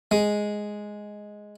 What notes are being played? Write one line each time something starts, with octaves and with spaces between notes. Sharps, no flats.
G#3